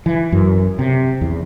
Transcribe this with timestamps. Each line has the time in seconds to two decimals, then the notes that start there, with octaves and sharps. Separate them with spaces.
0.06 E3
0.32 F#2
0.79 C3
1.21 E2